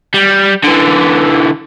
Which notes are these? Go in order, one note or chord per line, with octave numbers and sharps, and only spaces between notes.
G3
D3 E3